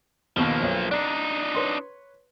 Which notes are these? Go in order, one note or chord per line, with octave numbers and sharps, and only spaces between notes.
D#2 B2 F3 A#3 A5
B1 C#5
D4 D#4 D5
B4 C#5 C6